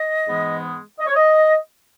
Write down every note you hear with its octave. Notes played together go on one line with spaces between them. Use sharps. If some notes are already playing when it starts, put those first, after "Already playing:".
Already playing: D#5
G#2 E3 G#3 B3
D#5
C#5
D#5